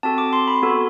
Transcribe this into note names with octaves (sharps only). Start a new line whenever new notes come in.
C4 F#4 A4 A5
D6
C6
B5
B3 F#4 A4